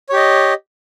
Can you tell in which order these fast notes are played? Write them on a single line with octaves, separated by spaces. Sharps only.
C#5 G4 D#5